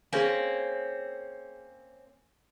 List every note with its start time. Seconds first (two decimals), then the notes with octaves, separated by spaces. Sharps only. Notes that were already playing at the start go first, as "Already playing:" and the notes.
0.13 A#3 C4 C#4 G#4 G#5